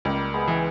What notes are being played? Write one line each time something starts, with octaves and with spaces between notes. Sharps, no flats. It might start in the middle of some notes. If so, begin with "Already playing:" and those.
C#2 G3 A#3
G#3 B3
E3